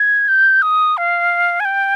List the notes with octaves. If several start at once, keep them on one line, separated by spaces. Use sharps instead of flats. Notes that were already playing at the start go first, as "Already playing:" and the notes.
Already playing: G#6
G6
D#6
F5
G#5
G5